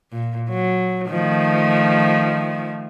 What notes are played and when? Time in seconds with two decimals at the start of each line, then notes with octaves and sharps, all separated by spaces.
0.12 A#2
0.50 F#3
1.08 D#3 F3 A3